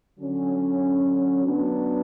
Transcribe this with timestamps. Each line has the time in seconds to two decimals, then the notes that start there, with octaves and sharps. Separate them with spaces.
0.18 D3 F#3 C#4
1.45 F#3 B3 D4